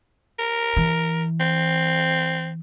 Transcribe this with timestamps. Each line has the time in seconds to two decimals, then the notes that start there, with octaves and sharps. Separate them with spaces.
0.39 A#4
0.77 E3
1.40 C4